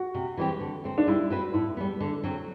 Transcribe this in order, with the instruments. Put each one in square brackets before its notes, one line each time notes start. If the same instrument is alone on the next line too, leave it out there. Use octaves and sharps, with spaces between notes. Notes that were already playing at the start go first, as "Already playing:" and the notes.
Already playing: [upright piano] F#4
[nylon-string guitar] C3
E3 G3 C4 G4
D3
A3 C4
[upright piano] D4
[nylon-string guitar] G3 [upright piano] E4
[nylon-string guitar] C4 F#4 B4
[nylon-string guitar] A2 [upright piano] E4
[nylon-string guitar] G3 B3
D3
F#3 C4 F#4